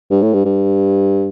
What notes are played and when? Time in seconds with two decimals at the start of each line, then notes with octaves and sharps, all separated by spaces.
0.11 G2
0.22 A2
0.33 G2
0.45 G2